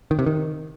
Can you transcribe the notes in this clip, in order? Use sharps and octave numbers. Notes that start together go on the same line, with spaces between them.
D#3
C3
D#3